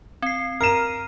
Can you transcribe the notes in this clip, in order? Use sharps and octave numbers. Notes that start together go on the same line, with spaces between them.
C4 C7
A#4 F6 C7 D#7 E7